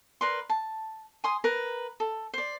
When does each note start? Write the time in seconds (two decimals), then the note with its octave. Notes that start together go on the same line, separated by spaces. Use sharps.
0.21 A#4 B4 D5 C6
0.49 A5
1.24 G#5 C6 D#6
1.44 A#4 B4
2.00 A4
2.34 C5 D5